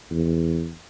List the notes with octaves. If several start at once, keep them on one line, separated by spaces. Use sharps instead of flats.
E2